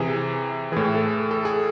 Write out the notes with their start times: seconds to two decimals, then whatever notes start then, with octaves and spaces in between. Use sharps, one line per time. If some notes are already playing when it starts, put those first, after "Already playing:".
Already playing: C3 E3 G#4
0.72 A2 E3 G#4
0.95 A4
1.31 A4
1.45 G#4